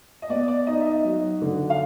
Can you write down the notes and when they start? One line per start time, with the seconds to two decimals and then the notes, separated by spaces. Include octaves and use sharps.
0.22 D#5
0.29 B3 D5
0.48 D5
0.67 D#4 D#5
0.81 E5
0.86 D#5
1.04 F#3
1.42 D3
1.70 F5